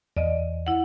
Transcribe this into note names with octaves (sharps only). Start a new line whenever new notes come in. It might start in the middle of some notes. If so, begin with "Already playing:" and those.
E2 D5 D#5
E4 F#5